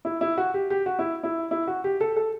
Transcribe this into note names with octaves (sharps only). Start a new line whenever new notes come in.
E4
E4
F#4
G4
G4
F#4
E4
E4
E4
F#4
G4
A4
A4